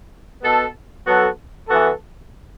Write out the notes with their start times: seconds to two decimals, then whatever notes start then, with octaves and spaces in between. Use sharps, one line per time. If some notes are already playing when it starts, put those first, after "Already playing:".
0.43 B2 B3 A4
1.06 F#3 B3 F#4 A4
1.69 E3 B3 F#4 A4